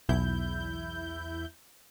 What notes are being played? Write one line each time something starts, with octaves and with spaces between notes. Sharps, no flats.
B1 E2 E4 G6